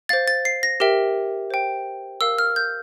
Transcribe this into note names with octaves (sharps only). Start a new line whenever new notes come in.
C5 F5 A6
A6
C7
A#6
G4 A#4 E5 G5
C5 G5
A#4 F5 E6
F6
G6